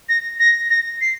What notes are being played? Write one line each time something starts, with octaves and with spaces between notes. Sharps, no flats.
A#6
A#6
A#6
C7